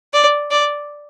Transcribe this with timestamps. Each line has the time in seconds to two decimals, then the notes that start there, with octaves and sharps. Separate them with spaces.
0.13 D5
0.51 D5